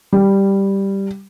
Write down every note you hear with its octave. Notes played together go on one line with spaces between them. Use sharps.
G3